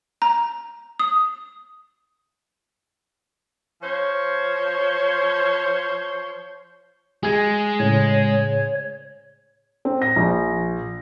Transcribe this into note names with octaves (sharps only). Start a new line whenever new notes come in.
A#5
D#6
F3 C5 C#5
G#3 G#4 G#6
A2 C#3 C#5
C4
A#6
A#1